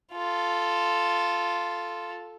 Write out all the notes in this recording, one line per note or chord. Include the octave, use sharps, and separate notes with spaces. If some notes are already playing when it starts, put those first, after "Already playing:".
F4 A4